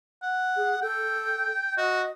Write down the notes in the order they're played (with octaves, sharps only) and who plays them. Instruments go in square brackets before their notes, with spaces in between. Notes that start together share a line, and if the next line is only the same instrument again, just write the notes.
[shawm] F#5
[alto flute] G#4
[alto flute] A4 [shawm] G5
[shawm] F#4 [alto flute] D#5